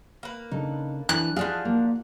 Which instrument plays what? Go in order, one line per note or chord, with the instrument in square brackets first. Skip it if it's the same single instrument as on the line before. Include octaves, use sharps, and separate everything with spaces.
[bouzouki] A#3 B4
[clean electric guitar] C#3 D4 A4 [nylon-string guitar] D#4
[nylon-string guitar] E3 [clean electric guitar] D4 A4 [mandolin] F#6
[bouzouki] F3 D4 F5 [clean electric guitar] F#4 [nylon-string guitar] G#4
[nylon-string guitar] A#3